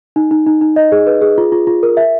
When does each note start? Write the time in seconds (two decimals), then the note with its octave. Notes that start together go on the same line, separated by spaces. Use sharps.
0.16 D#4
0.31 D#4
0.47 D#4
0.61 D#4
0.76 D#5
0.92 G#4
1.07 B4
1.22 G#4
1.38 F4
1.52 F4
1.67 F4
1.83 A#4
1.97 E5